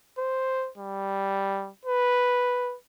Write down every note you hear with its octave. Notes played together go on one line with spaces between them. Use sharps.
C5
G3
B4